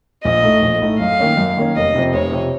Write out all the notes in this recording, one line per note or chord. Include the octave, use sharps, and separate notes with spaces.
A#1 D#5
A2 A3 D#4
A#1
A2 A3 D#4
F#2 F5
D#3 A#3 C#4
F#2
D#3 A#3 C#4
F1 D#5
F2 C3
F1 C#5
F2 C3